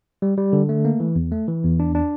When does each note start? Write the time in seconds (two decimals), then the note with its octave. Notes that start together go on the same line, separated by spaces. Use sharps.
0.22 G3
0.37 G3
0.53 D3
0.69 A3
0.85 A#3
1.00 E3
1.16 E2
1.32 A3
1.48 E3
1.64 E2
1.80 D4
1.95 D4